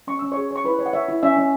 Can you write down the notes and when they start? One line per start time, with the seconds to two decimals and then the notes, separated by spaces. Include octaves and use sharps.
0.07 C#4 C#6
0.19 C#4 E6
0.32 G#4 C#5 C#6
0.51 C#5 C#6
0.64 E4 B4 B5
0.79 C#5
0.86 F#5
0.93 C#5 E5
1.08 E4
1.23 C#4 E5
1.37 C#4